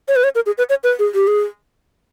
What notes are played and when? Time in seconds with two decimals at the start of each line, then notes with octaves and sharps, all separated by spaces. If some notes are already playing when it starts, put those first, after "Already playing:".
0.08 C#5
0.16 B4
0.24 C#5
0.35 A#4
0.46 G#4
0.58 B4
0.69 C#5
0.84 B4
0.99 G#4
1.15 G4
1.27 G#4